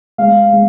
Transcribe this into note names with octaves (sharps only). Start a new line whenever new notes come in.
G#3 F5
G#3